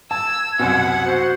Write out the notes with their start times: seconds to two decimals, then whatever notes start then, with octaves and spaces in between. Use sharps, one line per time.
0.11 A5 E6 G#6
0.59 C2 F#2 B2 F#5
1.03 F#4 C5